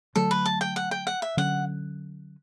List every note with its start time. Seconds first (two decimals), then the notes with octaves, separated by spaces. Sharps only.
0.15 D3 F#3 A3 A4
0.31 B4
0.46 A5
0.61 G5
0.76 F#5
0.91 G5
1.07 F#5
1.22 E5
1.37 D3 F#3 C#4 F#5